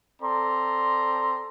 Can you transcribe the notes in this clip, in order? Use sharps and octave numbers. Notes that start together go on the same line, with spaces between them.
C4 A4 D5 A#5 C6